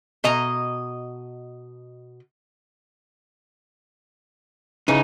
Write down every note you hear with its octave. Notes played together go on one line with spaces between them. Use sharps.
B2 D#5 A#5
C#3 E3 D#4